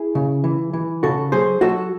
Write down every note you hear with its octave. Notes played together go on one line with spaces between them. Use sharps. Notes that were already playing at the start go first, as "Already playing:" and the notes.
Already playing: E4 G#4
C#3
E3
E3
C#3 F#4 A4
F#3 G#4 C5
F#3 F#4 A4